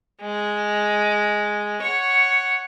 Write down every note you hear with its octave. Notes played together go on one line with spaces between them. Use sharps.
G#3
C#5 F#5